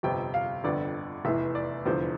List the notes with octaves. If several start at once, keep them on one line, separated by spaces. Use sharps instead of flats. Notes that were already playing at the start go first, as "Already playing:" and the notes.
G1 F2 C3 G5
F5
G1 F2 D3 D5
F1 E2 E3 E5
D5
F1 E2 D3 F3 C5